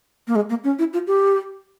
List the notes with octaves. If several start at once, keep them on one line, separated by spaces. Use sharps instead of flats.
A#3
G#3
A#3
C#4
E4
F4
G4